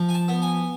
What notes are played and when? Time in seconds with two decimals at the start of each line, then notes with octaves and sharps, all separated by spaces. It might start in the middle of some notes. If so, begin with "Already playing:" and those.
Already playing: F3
0.09 G#5
0.14 A5
0.28 B3
0.42 G#5